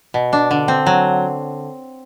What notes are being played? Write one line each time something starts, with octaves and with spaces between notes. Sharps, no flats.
B2
D4
D3
C4
F#3